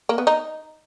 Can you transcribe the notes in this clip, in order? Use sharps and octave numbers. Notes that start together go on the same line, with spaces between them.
A#3
B3
D#4